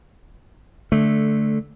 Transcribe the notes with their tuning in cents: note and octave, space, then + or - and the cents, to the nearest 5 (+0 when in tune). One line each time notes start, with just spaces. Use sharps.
D3 +0 A3 -10